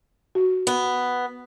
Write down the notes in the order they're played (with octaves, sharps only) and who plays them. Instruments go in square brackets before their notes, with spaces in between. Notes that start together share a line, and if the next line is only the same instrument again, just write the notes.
[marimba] F#4
[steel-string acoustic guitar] B3